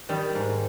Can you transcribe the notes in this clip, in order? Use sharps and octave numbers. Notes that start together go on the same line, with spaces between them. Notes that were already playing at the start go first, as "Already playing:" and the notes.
D#3 G3
G#2